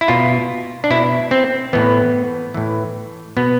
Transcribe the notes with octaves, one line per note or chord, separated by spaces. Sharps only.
E4
B2 F4
D4
B2 E4
C4
A2 E3 B3
A2 E3
B2 B3